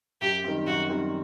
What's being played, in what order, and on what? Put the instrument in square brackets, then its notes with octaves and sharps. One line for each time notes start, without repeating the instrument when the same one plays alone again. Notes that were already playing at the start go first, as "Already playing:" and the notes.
[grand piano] F#2 [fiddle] G4
[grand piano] D#3 G3 C4
[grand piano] F#2 [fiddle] F#4
[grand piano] D#3 G3 C4